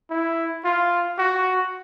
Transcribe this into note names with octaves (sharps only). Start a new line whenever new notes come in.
E4
F4
F#4